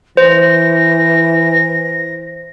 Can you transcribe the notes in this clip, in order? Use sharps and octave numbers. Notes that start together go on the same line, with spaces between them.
E3 C5 A#6